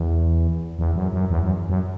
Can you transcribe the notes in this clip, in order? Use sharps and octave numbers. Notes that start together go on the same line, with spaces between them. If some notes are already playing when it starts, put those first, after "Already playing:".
Already playing: E2
E2
F#2
F#2
E2
F#2
F#2